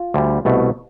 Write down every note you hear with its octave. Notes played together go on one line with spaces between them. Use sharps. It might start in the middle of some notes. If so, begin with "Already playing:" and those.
Already playing: F4
D2 D3 G3
C2 B2 A3